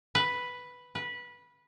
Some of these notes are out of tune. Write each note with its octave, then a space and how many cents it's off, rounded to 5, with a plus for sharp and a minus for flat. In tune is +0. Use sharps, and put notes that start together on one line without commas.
B4 +0
B4 -15